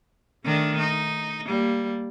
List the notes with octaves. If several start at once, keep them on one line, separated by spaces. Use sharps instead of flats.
D#3 A3 D4
D#4
G3 A#3